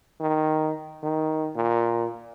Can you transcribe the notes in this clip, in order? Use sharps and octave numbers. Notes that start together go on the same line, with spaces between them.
D#3
D#3
A#2